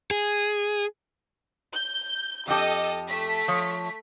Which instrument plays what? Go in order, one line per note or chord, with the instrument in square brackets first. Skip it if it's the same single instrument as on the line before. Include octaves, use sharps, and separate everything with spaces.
[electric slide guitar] G#4
[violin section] G6
[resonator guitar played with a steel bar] F2 G4 [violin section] A4 D#5
[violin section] A3 B6
[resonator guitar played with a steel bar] F3 C#5